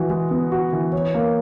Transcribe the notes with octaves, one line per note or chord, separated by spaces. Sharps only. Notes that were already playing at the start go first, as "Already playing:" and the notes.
Already playing: E3 F#4
G#3
B3
F#4
E3
C#5
A#3